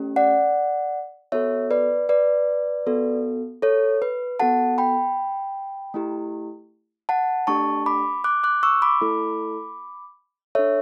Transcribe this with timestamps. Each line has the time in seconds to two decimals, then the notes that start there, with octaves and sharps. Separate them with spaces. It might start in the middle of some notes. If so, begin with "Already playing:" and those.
Already playing: A3 C#4 G4
0.16 D5 F#5
1.32 B3 F#4 A4 C#5 E5
1.71 B4 D5
2.09 B4 D5
2.86 B3 F#4 A4
3.62 A4 C#5
4.02 B4
4.40 B3 F#4 A4 F#5 A5
4.78 G5 B5
5.94 A3 E4 G4
7.09 F#5 A5
7.47 A3 D4 G4 A5 C#6
7.86 B5 D6
8.24 D6 F#6
8.44 D6 F#6
8.63 C#6 E6
8.82 B5 D6
9.01 A3 E4 A4
10.55 D4 A4 C#5 E5